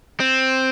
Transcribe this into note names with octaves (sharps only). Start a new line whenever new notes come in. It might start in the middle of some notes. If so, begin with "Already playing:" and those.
C4